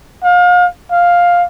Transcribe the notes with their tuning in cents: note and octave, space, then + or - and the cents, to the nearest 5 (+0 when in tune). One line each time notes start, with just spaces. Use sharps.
F5 +35
F5 +5